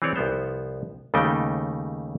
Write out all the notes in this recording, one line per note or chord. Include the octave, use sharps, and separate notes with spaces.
E3 C4 G#4 C#5 D5
C2 F3 B3 C5
D#2 C#3 G3 A3 D#4 G5